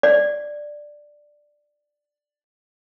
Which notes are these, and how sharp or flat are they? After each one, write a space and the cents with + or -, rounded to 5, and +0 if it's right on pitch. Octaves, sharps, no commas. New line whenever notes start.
D5 +5